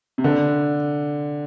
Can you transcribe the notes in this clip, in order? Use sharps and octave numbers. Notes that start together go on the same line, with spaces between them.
C3
D3